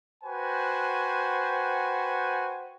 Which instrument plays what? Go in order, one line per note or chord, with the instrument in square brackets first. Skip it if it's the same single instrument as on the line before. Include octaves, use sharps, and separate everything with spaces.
[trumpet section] F#4 B4 C5 G5 G#5